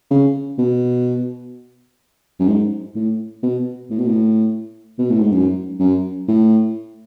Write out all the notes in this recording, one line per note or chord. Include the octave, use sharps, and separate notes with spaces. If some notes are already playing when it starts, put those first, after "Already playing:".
C#3
B2
F#2
G#2
A2
B2
A2
B2
A2
B2
A2
G#2
F#2
F#2
A2